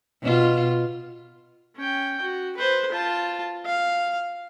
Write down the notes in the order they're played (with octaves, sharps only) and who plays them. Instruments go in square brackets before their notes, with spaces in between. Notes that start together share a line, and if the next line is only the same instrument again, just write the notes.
[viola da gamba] B2 F4
[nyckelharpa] C#4 G5
F#4
B4 C5
F4 A5
F5